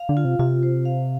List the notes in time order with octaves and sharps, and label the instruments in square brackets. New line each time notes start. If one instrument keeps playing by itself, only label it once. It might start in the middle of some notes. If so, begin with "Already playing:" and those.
Already playing: [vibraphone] F5
[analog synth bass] D3
[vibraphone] F4
[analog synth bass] C3
[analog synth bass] C3 [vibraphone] F4
[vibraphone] C5
F5